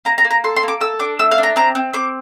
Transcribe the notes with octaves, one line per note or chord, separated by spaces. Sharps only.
A#3 A#5
A#5
A#3
A#5
A4 C6
C6
A#3
D6
A4 E6
D4 D6
A3 E6
F5
D4
A#5
C4 A#5
C4
C4 D6